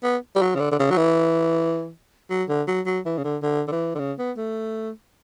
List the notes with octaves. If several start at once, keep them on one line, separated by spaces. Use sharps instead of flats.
B3
G3
F#3
C#3
D3
D3
C#3
F#3
E3
F#3
D3
F#3
F#3
E3
C#3
D3
D3
D3
E3
D3
C#3
B3
A3